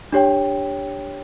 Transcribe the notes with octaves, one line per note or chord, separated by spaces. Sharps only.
D4 G4 C#5 G5